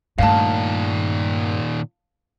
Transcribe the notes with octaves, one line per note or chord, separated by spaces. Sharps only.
G2 A#2 D#3 A3 F5 A5